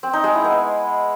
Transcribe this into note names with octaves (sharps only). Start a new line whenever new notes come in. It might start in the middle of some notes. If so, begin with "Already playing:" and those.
C4
D#4
G#3
E4
B3